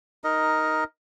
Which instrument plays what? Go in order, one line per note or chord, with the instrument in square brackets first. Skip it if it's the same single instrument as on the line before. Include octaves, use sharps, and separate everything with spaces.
[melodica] D#4 A#4 D#5